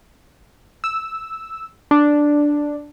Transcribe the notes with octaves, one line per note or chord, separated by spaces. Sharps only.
E6
D4